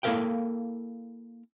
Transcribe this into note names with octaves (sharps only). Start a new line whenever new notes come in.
A#3 E4 A4 A#4 F5 G5